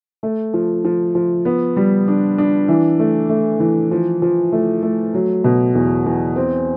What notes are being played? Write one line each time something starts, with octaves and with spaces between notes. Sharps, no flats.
A3
F3
F3
F3
B3
G3
D4
D4
E3
A3
A3
E3
F3
F3
A3
A3
F#3
B2
E2
E2
C4